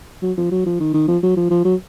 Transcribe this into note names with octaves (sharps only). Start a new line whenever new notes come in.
F#3
F3
F#3
F3
D#3
D#3
F3
F#3
F3
F3
F#3